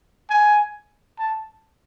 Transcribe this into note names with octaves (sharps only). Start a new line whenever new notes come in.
G#5
A5